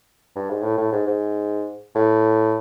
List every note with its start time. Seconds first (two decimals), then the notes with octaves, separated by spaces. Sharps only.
0.36 G2
0.50 G#2
0.63 A2
0.77 A2
0.92 G#2
1.07 G#2
1.95 A2